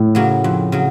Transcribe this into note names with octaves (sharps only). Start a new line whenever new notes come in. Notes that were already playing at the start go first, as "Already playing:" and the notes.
Already playing: A2
C#3 F#3 A#3
F2
C#3 F#3